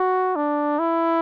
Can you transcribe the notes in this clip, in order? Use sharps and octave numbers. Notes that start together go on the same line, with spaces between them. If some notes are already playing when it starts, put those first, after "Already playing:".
Already playing: F#4
D4
E4